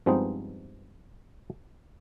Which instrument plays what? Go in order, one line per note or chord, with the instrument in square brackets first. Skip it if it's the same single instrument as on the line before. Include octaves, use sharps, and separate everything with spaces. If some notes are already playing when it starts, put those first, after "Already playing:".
[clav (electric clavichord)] G2 F3 G#3 B3 C4 D#4